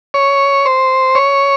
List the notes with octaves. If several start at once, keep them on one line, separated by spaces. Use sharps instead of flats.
C#5
C5
C#5